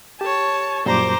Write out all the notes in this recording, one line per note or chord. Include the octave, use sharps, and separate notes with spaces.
G4 C#5 A5
F#2 A#2 G3 C5 A#5 D6